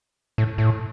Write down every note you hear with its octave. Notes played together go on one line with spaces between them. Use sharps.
A2
A2